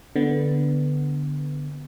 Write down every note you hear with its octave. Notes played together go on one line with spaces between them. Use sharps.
D3 B3